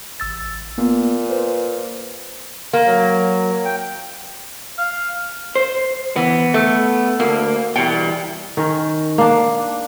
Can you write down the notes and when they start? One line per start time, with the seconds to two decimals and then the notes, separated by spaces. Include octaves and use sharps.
0.20 A1 E6 A6
0.78 A#2 A#3 B3
1.30 B4 C5
2.73 A#3
2.86 F#3
3.65 G5
4.78 F5
5.56 C5
6.16 E3 B3
6.54 A3
7.20 D2 A#3
7.76 B2 E3 G3 G5
8.57 D#3 C#4 A#4
9.18 A#3 D4